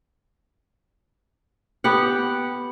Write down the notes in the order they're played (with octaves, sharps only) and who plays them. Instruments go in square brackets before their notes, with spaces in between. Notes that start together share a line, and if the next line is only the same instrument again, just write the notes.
[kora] B3 G4 F#5